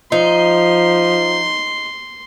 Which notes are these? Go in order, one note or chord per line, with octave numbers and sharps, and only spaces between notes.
F3 D#4 C6